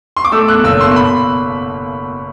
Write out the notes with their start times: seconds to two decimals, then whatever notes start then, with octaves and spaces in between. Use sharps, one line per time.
0.16 C6
0.25 D6
0.32 A3 E6
0.48 E2 F#6
0.64 F#1 E6
0.80 B2 C6
0.91 C6
0.96 B5